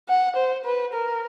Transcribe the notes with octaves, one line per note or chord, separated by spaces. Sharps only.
F#5
C5
B4
A#4